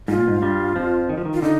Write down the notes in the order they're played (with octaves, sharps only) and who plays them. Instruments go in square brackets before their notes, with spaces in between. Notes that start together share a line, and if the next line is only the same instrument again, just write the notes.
[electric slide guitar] G#2 [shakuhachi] F4
[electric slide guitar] A#2
G#2
G2 G3
F2 F3
D#3
F3
D#3
[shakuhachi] F4
[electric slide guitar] D3 [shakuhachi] D#4